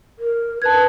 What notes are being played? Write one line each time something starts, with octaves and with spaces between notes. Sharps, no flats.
A#4
B4 A5 G#6